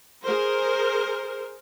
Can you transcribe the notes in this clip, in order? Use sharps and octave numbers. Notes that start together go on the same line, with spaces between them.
G#4 A#4 C5